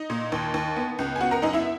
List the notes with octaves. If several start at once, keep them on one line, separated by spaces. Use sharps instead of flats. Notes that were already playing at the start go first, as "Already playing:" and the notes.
Already playing: D#4 D#5
A#2
D#2
D#2
B3
C#2
G#5
B3 F#4 F#5
A#4 A#5
F#2 D#4 D#5
E4 E5